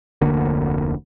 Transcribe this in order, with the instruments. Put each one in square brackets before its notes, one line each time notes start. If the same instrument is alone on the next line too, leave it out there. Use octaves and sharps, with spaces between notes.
[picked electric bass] F1 D2 D3 A#3